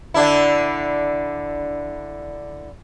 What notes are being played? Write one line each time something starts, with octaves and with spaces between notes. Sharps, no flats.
D3 D4 E4